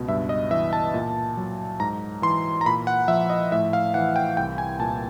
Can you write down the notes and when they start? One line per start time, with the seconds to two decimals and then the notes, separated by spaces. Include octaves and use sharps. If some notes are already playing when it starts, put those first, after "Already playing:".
Already playing: C#2 B2
0.08 G2 E5
0.29 D#5
0.51 E3 E5
0.73 A5
0.94 A#2
1.37 F#3
1.80 G#2 A#5
2.22 E3 C6
2.61 A#5
2.66 A#2 B5
2.87 F#5
3.08 F3 E5
3.30 D#5
3.52 A2 E5
3.73 F5
3.94 E3 F#5
4.16 G5
4.37 C2 G5
4.58 G#5
4.80 A#2 A5